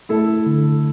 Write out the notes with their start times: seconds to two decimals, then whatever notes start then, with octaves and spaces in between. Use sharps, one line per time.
0.09 A3 E4 A4
0.46 D3